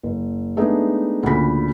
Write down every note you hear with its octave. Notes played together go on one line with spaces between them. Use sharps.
F#1
G#3 A3 B3 D4 D#4 G#4
D2 A#2 C#3 B5 B6